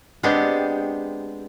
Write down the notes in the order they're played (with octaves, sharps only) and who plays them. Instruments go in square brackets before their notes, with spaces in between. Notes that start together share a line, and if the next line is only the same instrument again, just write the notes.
[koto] G#3 B3 C4 D4 G4